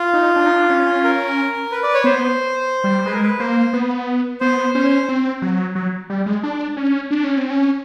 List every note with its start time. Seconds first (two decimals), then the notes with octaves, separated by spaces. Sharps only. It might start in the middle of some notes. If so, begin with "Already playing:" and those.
Already playing: F4
0.14 D#4
0.36 D4
0.46 D#4
0.56 D4
0.70 C#4
1.04 A#4
1.71 B4
1.83 D5
1.94 C#5
2.04 B3 C5
2.84 G3
3.06 G#3 B4
3.14 A#4
3.23 B4
3.39 A#3 C5
3.73 B3
4.40 B3 C5
4.74 C#4 C5
5.09 C4
5.42 F#3
5.75 F#3
6.10 G3
6.26 G#3
6.43 D4
6.77 C#4
7.11 D4
7.24 C#4
7.37 C4
7.50 C#4